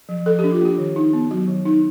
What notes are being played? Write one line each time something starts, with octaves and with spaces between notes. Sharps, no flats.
F3
F3 A4
G4
D4
F4
A#3 G4
D#3
D#4
B3
F#3 F#4
D#3
D#4